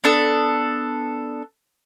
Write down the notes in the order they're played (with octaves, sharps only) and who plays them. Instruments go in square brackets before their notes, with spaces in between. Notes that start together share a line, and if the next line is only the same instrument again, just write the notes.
[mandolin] B3 D4 A4